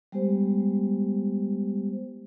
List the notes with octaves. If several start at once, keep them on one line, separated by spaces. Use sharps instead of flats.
G3 G#3 B3 G4 C5